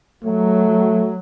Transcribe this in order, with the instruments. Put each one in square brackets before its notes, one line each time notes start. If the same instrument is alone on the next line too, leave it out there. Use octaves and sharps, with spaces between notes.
[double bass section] F#3 [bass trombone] A3